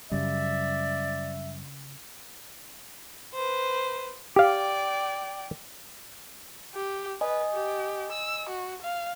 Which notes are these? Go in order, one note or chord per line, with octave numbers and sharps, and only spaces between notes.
F#2 C#3 G3 D5 E5
B4 C5
G4 D5 F5 G5
G4
B4 D#5 G#5
G4
E6
F#4
F5